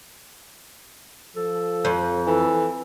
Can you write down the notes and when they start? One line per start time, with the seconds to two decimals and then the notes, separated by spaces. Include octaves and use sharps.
1.36 F3 A4
1.85 F2
2.27 E3 A4